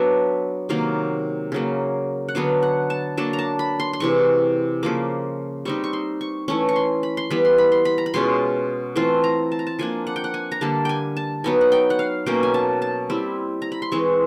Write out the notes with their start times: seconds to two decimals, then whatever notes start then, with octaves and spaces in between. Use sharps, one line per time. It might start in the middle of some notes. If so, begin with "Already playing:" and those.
Already playing: F#3 B3 D4 E5
0.69 C3 D#3 F#3 A#3 F5
1.52 C#3 F#3 A#3
2.28 F#5
2.35 D3 F#3 B3 D4 F5
2.63 F#5
2.90 A5
3.17 F#3 A#3 D4 A5
3.33 A#5
3.39 A5
3.59 B5
3.80 C6
3.93 C6
4.00 C3 E3 G#3 C#6
4.83 C#3 F3 A#3 D6
5.65 G3 C4 D#4 C#6
5.84 C#6
5.93 C6
6.21 C#6
6.48 E3 A3 C#4 C#6
6.69 C#6
6.76 C6
7.03 B5
7.17 C6
7.30 E3 G3 B3 B5
7.45 C6
7.58 B5
7.72 C6
7.85 B5
7.98 A#5
8.06 B5
8.14 B2 G#3 C#4 F4 C6
8.96 E3 A3 C4 F4 C6
9.24 A#5
9.52 A5
9.59 A#5
9.67 A5
9.79 F3 A#3 D4 G#5
10.07 F#5
10.16 G5
10.24 F#5
10.34 G#5
10.52 A#5
10.61 D3 G3 A#3 A5
10.85 G5 G#5
11.17 A5
11.44 F#3 B3 D#4 G#5
11.61 F#5
11.72 G5
11.90 F#5
11.99 F5
12.26 B2 F#3 A#3 C#4 G5
12.43 G#5
12.54 A5
12.82 A5
13.10 G3 C4 E4
13.62 A#5
13.72 B5
13.82 C6
13.92 E3 G#3 C4 C#6